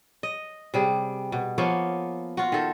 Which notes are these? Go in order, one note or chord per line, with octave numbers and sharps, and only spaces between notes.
D#5
C3 G3 G#4
B2
F3 A#3 B3 C#5
F4 F#4
D#3 A4